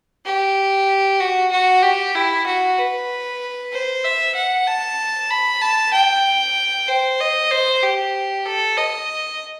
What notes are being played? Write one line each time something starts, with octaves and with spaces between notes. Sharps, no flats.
G4
F#4
F#4
G4
E4
F#4
B4
C5
E5
F#5
A5
B5
A5
G5
C5
D#5
C5
G4
A4
D#5